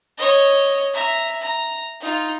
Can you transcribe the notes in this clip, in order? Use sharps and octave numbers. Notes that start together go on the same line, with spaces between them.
C#5 D#5
E5 A#5
A#5
D#4 F4